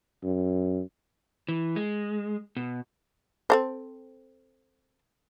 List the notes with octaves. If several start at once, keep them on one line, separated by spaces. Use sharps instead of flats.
F#2
E3
G#3
B2
C4 A4 C5